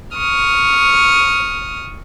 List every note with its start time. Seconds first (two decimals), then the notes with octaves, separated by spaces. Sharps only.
0.17 C#6 D#6 F6